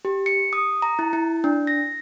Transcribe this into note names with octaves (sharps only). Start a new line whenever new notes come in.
G4
C#7
D#6
A#5
E4
E4
D4
A#6